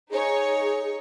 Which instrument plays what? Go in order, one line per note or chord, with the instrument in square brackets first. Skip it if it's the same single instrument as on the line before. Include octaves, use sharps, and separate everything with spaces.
[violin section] D#4 C#5 [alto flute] G#4